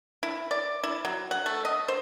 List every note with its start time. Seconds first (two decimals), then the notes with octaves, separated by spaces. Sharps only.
0.23 E4
0.51 D5
0.83 E4
1.05 F#3
1.31 F#5
1.46 A3
1.65 D#5
1.88 C5